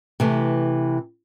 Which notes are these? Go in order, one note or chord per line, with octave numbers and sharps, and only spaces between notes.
C3 E3 A3